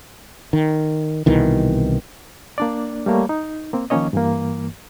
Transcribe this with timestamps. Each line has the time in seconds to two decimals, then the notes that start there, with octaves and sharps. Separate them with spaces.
0.53 D#3
1.26 C2 B2 D#3 E3
2.58 A#3 D4 D5
3.06 G3 A3 A#3 C#5
3.29 D#4
3.73 A#3 C4
3.90 D#3 F3 A#3 C#4 C#5 D#5
4.13 G2 E3 A#3